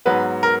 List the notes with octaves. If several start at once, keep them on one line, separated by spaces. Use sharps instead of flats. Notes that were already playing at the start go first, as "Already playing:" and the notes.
G#2 F#3 B3 B4
A#4